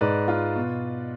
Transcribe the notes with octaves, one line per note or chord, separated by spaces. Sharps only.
G#2 B4 D5
F4
B2